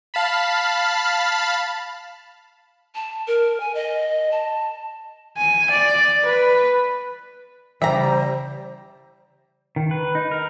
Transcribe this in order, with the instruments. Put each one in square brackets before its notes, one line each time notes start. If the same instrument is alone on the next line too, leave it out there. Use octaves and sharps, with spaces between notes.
[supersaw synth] F5 A5 B5
[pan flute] A5
A#4
G#5
D#5
A5
[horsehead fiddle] G#5
D5
B4
[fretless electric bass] C#3 E3 [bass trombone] G3 [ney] C5 [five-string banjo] E5 A#5
[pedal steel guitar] D#3
B4
D#4
A#4